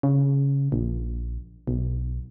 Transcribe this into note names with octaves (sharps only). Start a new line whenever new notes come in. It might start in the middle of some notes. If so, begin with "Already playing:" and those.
C#3
A#1
B1